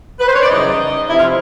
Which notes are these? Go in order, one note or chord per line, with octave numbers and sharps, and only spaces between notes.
B4
C5
C#5
D5
F#2 C#3 E3 G3 D#4 D#5
F2 C3 E3 E4 E5
F4 F5